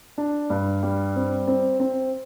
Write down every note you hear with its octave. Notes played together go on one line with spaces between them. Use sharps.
D4
G2
G3
C4
C4
C4